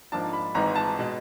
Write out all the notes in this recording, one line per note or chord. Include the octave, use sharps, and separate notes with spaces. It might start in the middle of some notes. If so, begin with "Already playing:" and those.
G#2 F3 A#3 D4 A5
B5
G#1 G#2 E3 G#3 A#5
A5
B2 G#3